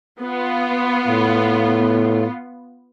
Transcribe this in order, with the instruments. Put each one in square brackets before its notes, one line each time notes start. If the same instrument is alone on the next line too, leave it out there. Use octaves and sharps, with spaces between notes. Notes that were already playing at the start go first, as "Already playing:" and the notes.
[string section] B3 F4
[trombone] A2